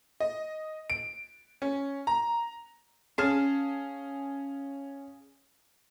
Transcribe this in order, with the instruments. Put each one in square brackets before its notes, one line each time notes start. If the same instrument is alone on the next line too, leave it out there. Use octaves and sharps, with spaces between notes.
[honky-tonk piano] D#5
D7
C#4
A#5
[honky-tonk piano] C#4 [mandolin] G#4 F5 A5